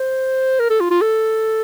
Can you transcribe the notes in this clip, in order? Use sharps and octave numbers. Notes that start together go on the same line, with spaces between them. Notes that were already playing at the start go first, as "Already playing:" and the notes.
Already playing: C5
A#4
A4
F4
F4
A4